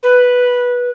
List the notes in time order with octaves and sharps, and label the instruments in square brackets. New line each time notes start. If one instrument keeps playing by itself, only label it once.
[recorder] B4